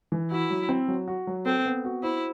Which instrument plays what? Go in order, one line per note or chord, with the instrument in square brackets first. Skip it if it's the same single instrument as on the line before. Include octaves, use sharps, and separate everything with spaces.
[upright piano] E3
[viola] E4 [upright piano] F#4
[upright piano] F#3
C4
F#3
F#4
F#3
[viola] C4 [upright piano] A4
[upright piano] B3
F#4
[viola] E4 [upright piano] C5